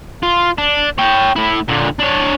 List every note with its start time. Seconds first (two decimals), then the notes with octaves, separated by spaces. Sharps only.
0.23 F4
0.58 D4
0.98 C#5 G5
1.36 A2 E4
1.68 A#2 D3
1.99 D4 C#5